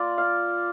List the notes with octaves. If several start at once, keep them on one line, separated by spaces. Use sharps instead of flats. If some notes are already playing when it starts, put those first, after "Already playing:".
Already playing: A#3 F4 D5
F5